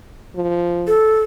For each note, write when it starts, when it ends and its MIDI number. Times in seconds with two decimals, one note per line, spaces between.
0.36 0.93 53
0.87 1.22 69